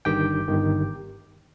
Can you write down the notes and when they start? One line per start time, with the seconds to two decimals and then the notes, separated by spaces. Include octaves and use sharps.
0.05 G1 G2 D#3 G4 G5
0.48 G1 G2 D#3